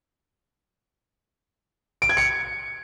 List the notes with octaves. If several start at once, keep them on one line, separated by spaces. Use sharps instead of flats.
D7
G#6
C#7